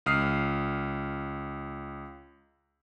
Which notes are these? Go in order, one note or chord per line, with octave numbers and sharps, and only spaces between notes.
C#2 D#6 F6 C7